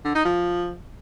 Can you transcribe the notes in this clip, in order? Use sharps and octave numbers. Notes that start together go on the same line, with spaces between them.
D3
D#4
F3